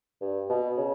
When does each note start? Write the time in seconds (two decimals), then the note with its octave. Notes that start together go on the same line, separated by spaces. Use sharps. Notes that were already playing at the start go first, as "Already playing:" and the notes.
0.21 G2
0.49 B2
0.77 C#3